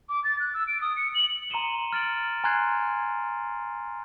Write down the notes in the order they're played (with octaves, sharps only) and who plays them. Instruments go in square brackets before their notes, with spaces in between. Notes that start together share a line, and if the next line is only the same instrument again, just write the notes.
[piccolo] D6
A6
F#6
E6
D7
D#6
C#7
F#7
[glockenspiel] A#5 C6 C#7 D#7 E7 G7
F6 A6 D7 F#7
G#5 A#5 C6 F#6 G#6 C7